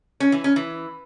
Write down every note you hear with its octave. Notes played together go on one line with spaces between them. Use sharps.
C#4
E3
C#4
E3